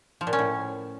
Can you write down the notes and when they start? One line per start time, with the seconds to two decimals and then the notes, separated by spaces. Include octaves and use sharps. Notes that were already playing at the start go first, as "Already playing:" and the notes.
0.21 F3
0.27 A#2
0.33 C#4
0.39 A2